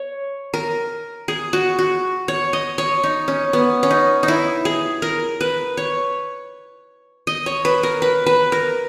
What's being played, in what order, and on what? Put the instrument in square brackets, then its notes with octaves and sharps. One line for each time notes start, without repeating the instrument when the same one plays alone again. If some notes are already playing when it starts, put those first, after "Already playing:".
Already playing: [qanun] C#5
A#4
G#4
F#4
F#4
C#5
D#5
C#5
D#4
C#4
B3
C#4
D#4
D#4
E4
G#4
A#4
B4
C#5
D#5
C#5
B4
A#4
B4
B4
A#4